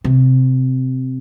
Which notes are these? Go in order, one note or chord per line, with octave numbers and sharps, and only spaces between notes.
C3